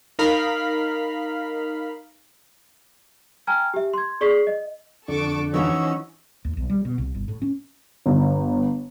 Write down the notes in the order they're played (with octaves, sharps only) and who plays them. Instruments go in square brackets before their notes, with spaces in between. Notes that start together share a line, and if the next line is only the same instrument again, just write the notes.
[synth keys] D#4 A#4 F5 B5
[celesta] G5 G#5 A#5 F6 G#6
G4 E5
C6 G#6
G#4 D5 C#6 B6 C7
D#5
[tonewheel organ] F2 D3 D4 [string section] A4 C#6 D6
[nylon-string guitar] E3 D#4 E5 [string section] F3 C#4 [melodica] F#4 D#5 E6
[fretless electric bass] D#2
B1
G3
B2
C2
G1
A2
C#4
[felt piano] G1